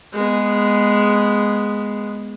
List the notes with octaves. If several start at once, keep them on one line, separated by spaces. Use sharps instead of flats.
G#3 B3